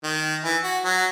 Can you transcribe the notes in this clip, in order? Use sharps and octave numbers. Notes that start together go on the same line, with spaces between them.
D#3
E3
F#4
F#3